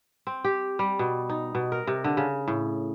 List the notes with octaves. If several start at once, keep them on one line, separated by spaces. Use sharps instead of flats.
C4
G4
G3
B2
D#4
B2
A#4
C3
D3
C#3
A2